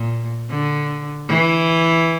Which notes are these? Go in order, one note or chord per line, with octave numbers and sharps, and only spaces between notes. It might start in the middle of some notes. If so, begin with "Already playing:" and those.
Already playing: A#2
D3
E3